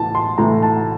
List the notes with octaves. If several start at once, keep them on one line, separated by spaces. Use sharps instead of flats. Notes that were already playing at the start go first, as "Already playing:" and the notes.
Already playing: A2 E3 A5
C6
A2 E3 A#5
A5